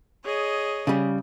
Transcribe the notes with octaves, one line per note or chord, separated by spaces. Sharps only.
G#4 C#5 D#5
C#3 G3